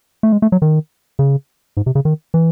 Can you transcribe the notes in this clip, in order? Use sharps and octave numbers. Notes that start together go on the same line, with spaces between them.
A3
G#3
A3
F#3
D#3
C#3
G#2
C3
C#3
D#3
E3